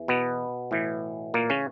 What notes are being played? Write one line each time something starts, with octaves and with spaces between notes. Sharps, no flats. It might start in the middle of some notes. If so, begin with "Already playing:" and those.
Already playing: E2 E3
B2 B3
A2 E3
A#2 A#3
C#3 C#4